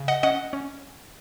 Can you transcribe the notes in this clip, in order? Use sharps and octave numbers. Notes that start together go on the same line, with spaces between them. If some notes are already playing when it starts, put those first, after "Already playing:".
Already playing: C#3
D#5 F#5
C#4 D#5 F#5
C#4